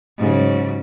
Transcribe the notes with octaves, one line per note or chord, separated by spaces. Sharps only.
G#2 C#3 F#3